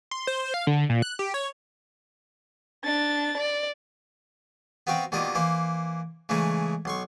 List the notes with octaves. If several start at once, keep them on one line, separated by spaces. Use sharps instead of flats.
C6
C5
F5
D3
A#2
F#6
G4
C#5
D4 A6
D5
B3 C4 F#4 F5 G5
B2 D#3 G3 A#3 F4 D#5
E3 A#3 C5
C#3 E3 G#3 A3 D#4
B1 C6 C#6